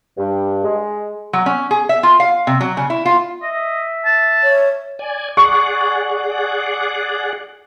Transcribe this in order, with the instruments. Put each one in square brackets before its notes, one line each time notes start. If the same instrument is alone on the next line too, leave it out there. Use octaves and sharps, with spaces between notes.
[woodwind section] G2
G#3
[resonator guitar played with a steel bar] F#3
C#4
G#4
E5
F4
F5
C3
F#3
C#3
E4
F4
[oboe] D#5 [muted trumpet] E5
[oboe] A5
[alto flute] C#5
[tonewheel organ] D5 G#5
[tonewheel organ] G#4 D5 F#5 [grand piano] C#6